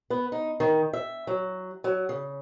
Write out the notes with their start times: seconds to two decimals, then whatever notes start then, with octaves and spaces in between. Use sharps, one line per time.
0.10 B3
0.32 D#4
0.60 D#3
0.93 E5
1.27 F#3
1.84 F#3
2.09 C#3